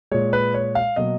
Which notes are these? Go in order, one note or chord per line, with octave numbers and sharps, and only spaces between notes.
A#2 G#3 C#5
B4
C#5
F5
B2 F#3 A#3 D#5